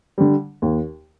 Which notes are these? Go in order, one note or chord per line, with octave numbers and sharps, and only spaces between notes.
D3 G3
D#2